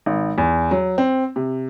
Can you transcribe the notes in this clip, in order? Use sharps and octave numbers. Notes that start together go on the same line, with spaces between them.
G#1
E2
F#3
C4
C3